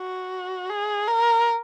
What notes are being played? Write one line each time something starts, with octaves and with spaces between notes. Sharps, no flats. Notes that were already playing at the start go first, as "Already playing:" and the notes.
Already playing: F#4
G#4
A#4